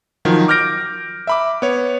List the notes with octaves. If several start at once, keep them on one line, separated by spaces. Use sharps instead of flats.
D#3 F3 F#3
D6 F6 G6 A#6 D7
E5 B5 D6
B3 C#5